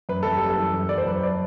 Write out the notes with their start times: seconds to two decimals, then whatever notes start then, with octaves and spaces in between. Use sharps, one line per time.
0.09 F#2 B4
0.23 F#2 A4
0.36 G4
0.42 G3
0.50 A4
0.58 E3
0.74 F#2
0.89 F#2 D5
0.98 C5
1.06 F#2 B4
1.23 D5